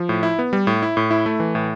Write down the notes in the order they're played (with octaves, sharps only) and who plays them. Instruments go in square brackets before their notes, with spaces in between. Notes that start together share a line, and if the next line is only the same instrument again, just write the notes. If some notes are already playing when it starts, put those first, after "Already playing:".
Already playing: [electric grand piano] F3
A2
E4
B3
G3
A2
E4
A2
E4
A3
E3
A2